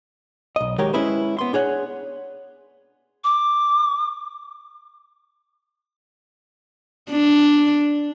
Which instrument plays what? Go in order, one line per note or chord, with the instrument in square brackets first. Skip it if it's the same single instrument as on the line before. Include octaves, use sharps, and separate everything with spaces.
[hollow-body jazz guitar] B1 D#5
D#3 G#3 F#4 G4 A#4 C#5
G#3 C#4 E4 G#4 B4 C5
B3 C6
D4 G#4 C#5 F#5
[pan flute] D6
[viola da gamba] D4